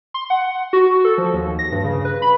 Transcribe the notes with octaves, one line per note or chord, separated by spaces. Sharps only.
C6
F#5
F#4
A4
F3
D#2
A#6
G2
C#3
B4
B5